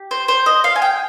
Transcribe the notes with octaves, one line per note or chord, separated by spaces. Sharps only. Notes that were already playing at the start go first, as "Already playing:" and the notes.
Already playing: G4
C5
C5
D#5
F5
G#5
G5